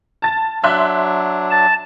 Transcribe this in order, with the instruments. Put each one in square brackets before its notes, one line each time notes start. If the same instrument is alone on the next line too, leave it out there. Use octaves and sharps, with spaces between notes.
[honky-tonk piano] A5 A6
[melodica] F#3 D4 [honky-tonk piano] E5 C6 F#6
[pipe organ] A5